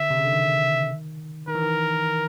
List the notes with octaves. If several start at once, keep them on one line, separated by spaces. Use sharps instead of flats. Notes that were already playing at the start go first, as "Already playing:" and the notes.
Already playing: D3 E5
C3
C#3
D3
D#3
D#3 A#4
E3
D#3